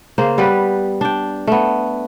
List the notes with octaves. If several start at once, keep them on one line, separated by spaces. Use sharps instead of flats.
C#3 A#3 C5
G3 B3 G4 B4
D4 G5
A3 B3